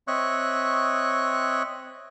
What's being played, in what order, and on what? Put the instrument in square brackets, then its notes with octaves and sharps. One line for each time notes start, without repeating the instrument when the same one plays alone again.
[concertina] C4 C#5 D#5 E5 C#6 F#6